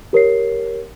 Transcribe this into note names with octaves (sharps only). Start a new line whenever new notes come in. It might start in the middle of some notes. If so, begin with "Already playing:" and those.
G4 A#4 C#5 C7